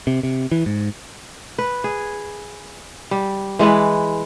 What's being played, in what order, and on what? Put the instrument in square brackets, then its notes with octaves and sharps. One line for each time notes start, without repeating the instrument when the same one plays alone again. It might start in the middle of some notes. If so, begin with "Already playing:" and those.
[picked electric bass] C3
C3
E3
G#2
[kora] B4
G#4
G3
E3 G#3 E4 B4